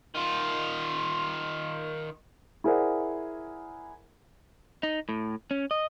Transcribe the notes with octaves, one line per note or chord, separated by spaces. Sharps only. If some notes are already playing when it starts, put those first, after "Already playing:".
D#3 F4
E4 G#4 A#4 C5 D5 F#5
D#4
A2
C#4
D#5